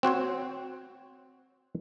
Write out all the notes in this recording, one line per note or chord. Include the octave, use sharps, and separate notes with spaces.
C4 F#4 C5 C#5